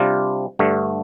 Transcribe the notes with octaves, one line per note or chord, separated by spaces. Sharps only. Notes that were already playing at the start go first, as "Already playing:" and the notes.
Already playing: C3 G3 D4 F4
G2 D3 A3